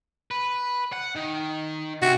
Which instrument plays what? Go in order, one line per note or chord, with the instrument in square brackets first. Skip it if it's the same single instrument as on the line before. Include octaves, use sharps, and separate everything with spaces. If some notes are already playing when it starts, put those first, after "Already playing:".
[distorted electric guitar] B4
F#5
D#3
[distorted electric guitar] C3 [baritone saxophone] F#4